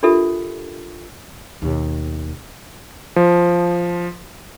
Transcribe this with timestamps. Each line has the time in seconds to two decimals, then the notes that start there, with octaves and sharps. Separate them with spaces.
0.03 D4 F4 G4 A4 A#4 E5
1.62 D#2 B2
3.16 F3